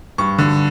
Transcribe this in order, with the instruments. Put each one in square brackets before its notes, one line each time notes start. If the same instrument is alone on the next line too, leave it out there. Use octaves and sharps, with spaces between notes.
[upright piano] G2 C#6
D3